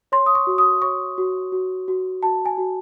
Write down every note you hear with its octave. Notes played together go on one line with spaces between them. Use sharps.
C#5 C6
D#6
C#6
F#4
D#6
C#5 C#6
F#4
F#4
F#4
F#4 A5
G#5
F#4